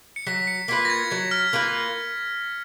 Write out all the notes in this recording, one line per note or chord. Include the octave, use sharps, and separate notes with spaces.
C#7
F#3 B6
C#7
A#3 F4 B4 B6
A#6
G#6
F#3 G#6
F6
A#3 F4 B4